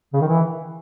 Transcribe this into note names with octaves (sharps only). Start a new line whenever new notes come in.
C#3
D#3
E3